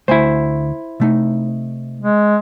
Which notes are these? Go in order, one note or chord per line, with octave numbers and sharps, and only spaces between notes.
D2 A3 E4 C5 G#5
C3 A3 D#4
G#3